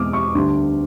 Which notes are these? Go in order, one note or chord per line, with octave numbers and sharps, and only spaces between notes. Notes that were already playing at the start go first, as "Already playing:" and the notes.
Already playing: E2 B2 G#3 C4 D6 D#6 F6
C#6
D2 D3 G3 C6